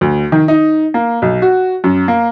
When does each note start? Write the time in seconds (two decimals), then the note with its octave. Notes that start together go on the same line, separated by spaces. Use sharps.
0.01 D2
0.32 D#3
0.48 D#4
0.94 A#3
1.22 B1
1.42 F#4
1.84 F#2
2.08 A#3